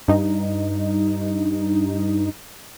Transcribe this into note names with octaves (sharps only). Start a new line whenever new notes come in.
G2 D#4